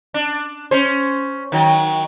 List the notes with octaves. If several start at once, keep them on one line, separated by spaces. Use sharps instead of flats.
D4
C#4 C5
D#3 F#3